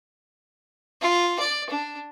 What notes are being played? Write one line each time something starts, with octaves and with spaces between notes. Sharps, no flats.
F4
D5
D4